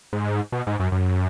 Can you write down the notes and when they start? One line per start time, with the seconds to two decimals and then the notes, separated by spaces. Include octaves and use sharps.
0.13 G#2
0.52 B2
0.67 G#2
0.80 F#2
0.92 F#2